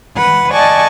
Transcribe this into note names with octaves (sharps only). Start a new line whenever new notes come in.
B4 F#5
D5 D#5 F#5 G#5 A5 C#6